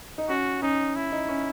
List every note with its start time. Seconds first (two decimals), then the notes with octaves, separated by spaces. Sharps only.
0.18 D#4
0.29 C#4 F#4
0.62 C#4 D#4
0.96 E4
1.12 D#4
1.28 C#4